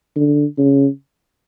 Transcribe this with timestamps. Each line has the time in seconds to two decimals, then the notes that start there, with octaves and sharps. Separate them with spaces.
0.16 D3
0.58 C#3